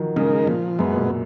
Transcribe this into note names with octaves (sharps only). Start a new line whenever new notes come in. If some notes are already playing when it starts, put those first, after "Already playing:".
Already playing: D#3 F3 F#3
C#3 G#3 D#4 A#4
A#2 F3
F#2 G#3 B3
B2
A#2